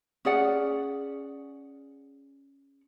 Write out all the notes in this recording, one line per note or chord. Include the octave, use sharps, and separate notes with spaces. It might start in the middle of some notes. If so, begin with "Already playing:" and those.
C#4 G#4 D5 F#5